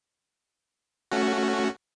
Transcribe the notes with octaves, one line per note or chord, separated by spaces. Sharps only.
A3 C#4 F#4